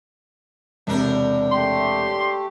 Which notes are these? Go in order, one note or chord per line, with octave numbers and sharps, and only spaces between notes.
E1 A2 C3 D4 A#4
A3 G4 C6